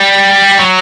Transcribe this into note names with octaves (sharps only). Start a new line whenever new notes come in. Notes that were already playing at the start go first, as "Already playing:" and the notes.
Already playing: G3
F#3